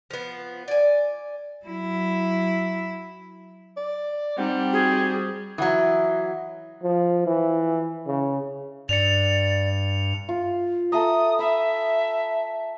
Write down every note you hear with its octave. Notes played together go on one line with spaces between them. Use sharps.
F3 B3
D5 G#5
F#3 E4
D5
G3 C4 D#4 G4 F#5
F#4 G#4
E3 F#3 E5 F#5 D#6
F3
E3
C#3
G2 D5 C#7 F7
F4
A4 E5 A#5 D#6
E5 B5